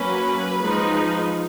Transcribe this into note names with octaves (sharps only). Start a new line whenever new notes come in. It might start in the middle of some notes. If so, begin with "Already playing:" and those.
Already playing: F#3 A#3 C#4 B4
F3 G#3 D#4